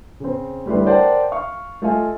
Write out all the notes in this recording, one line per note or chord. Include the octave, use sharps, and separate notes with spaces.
C#3 C4
D2 G3 E4 B4 C6
A#4 C5 D5 F#5 G5 A5
F5 C#6
A3 F4 A4 D#5 F5 G#5